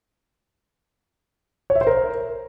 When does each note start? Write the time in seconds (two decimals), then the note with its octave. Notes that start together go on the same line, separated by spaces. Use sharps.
1.70 C#5
1.75 E5
1.81 C5
1.87 A#4